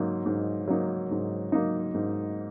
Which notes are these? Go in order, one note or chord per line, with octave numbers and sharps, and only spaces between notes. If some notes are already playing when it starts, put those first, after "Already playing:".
Already playing: G#2 F#3 A#3 D#4
G#2
F#3 A#3 D#4
G#2
F#3 A#3 D#4
G#2